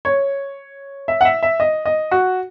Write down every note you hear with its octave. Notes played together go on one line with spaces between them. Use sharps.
C#5
E5
F#5
E5
E5
D#5
D#5
F#4